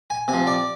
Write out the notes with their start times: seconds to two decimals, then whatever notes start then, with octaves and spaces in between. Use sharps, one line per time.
0.10 G#5
0.28 C3 G#5
0.34 F3
0.47 D5